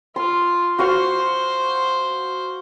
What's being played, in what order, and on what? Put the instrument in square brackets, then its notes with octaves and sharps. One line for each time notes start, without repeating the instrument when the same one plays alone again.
[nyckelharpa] F4 [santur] C6
[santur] F#4 F5 C#6 [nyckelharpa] C5